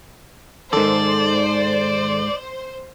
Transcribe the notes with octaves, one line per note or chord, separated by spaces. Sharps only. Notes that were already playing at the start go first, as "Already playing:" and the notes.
E2 G#2 D#3 A4 C5 D5